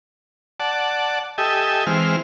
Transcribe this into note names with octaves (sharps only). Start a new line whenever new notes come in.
D5 F#5 A5
G4 A4 D#5 E5 G#5
E3 G#3 C4 F6